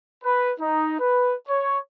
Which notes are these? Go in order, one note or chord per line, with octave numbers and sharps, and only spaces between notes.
B4
D#4
B4
C#5